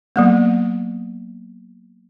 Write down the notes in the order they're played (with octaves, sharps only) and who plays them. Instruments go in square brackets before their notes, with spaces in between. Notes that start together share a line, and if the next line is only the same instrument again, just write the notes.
[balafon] F#3 A#3 B3